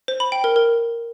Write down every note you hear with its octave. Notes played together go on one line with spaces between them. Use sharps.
C5
B5
G5
A#4
A#4